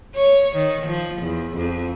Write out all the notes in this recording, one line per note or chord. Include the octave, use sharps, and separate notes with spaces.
C#5
D#3
F3
E2
F2